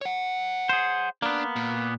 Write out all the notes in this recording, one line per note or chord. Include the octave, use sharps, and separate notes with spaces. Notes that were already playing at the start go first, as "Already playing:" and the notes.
C#5 F#5
G#4 C5
A#3 B3 D4
A#2